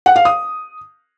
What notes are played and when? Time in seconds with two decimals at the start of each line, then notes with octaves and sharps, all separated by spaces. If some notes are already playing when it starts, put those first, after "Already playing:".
0.06 F#5
0.16 F5
0.25 D#6